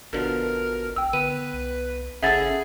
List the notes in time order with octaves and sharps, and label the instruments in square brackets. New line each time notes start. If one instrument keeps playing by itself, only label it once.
[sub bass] A1 [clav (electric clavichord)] B2 D3 F3 [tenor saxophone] A#4
[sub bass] A#1 [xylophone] G5 E6
[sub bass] D3 [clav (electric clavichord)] B3 [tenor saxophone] B4 [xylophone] D#7
[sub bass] C2
[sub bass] G#1 [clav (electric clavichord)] C#3 E4 A4 [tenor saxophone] G#4 [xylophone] E5 F#5 A6